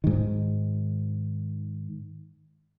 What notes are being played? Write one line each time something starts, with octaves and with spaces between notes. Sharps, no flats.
G#2 D#3